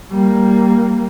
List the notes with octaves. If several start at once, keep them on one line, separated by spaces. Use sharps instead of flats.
G3 A#3